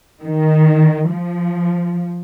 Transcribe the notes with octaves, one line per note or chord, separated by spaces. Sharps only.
D#3
F3